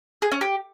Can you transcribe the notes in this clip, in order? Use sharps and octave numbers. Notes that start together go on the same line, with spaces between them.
G#4
C#4
G4